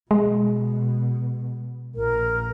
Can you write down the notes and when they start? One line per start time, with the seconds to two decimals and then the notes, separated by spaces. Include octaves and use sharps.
0.11 B2 G#3
1.96 A#1 A#4